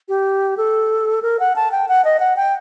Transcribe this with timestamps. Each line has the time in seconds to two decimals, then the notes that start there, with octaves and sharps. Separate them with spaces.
0.09 G4
0.57 A4
1.22 A#4
1.40 F#5
1.56 A5
1.71 G5
1.88 F#5
2.05 D#5
2.20 F#5
2.36 G5